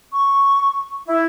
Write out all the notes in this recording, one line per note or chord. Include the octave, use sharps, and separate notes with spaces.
C#6
E4